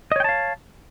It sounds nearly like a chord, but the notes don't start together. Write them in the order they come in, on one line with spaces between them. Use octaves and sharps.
D#5 C#5 G5 A5 F5